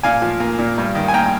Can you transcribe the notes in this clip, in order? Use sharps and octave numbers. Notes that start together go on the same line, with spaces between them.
A#2 F5 G#5
F3
A#3
A#2
G2
D#3
G#5
A#3 G5 A#5